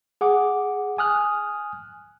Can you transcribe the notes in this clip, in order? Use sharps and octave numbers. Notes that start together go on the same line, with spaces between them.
G#4 F#5 D6
G#5 D#6 F6 F#6